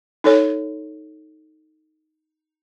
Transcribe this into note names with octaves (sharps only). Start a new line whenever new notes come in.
D#4 A4 C#5